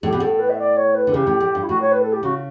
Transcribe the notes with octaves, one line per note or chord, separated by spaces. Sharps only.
A2 G4
B2
A2 A4
B4
E5
D5
C#5
B4
D3
C#3 G4
A2
A2
G2
E4
A2 F#4
C#5
B4
A4
G4
C#3 F#4